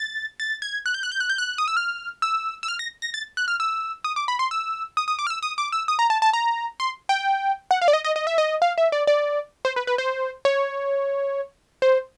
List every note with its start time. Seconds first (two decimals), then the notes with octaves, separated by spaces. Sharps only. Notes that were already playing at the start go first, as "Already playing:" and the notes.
Already playing: A6
0.40 A6
0.62 G#6
0.86 F#6
0.94 G6
1.03 F#6
1.12 G6
1.20 F#6
1.30 G6
1.38 F#6
1.58 D#6
1.68 E6
1.77 F6
2.22 E6
2.63 E6
2.68 F6
2.79 A#6
3.02 A#6
3.14 A6
3.37 F#6
3.48 F6
3.60 E6
4.04 D#6
4.16 D6
4.28 B5
4.39 C6
4.51 E6
4.97 D#6
5.08 D#6
5.19 D6
5.27 F6
5.30 E6
5.43 D#6
5.58 D6
5.72 E6
5.88 D#6
5.99 A#5
6.10 A5
6.22 A5
6.33 A#5
6.80 C6
7.09 G5
7.71 F#5
7.82 F5
7.88 D5
7.93 D#5
8.04 D#5
8.16 D#5
8.27 E5
8.38 D#5
8.62 F5
8.78 E5
8.92 D5
9.07 D5
9.65 C5
9.76 B4
9.87 B4
9.98 C5
10.45 C#5
11.82 C5